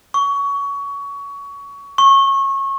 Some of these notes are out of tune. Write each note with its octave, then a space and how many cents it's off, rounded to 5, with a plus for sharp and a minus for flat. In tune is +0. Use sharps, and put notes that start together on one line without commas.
C#6 +20
C#6 -25